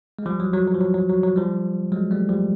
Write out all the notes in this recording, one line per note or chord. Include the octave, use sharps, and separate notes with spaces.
G#3
F3 G3
F#3
F#3
F#3
F3
F#3
F#3
F#3
F#3
F3 G3
F#3 G#3
G3 A3
F3 G3